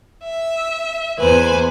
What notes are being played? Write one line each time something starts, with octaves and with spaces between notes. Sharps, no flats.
E5
E2 B4 C5 G#5